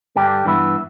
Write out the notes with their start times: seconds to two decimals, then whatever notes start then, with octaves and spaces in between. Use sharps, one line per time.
0.16 G2 D3 G3 D4 G4
0.46 G2 E3 B3 E4